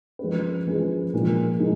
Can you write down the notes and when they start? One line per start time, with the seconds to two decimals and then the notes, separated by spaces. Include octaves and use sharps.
0.19 F3 G#3 C#4 G#4 B4
0.67 F3 G#3 C#4 G#4 B4
1.13 A#2 F3 G#3 D#4
1.59 A#2 G#3 D#4